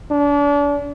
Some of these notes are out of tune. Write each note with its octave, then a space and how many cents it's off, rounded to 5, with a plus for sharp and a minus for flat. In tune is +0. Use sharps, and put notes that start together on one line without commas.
D4 -35